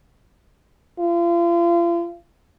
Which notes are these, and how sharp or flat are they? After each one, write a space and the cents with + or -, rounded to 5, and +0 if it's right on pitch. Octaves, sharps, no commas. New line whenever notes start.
F4 -35